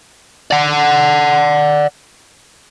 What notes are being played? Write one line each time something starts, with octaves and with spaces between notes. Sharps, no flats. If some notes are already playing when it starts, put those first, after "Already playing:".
D5 F#5